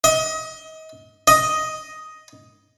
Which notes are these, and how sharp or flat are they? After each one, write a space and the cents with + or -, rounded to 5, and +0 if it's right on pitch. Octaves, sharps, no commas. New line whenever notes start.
D#5 +30
D#5 +5